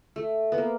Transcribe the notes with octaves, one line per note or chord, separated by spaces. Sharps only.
A3
B3
A#3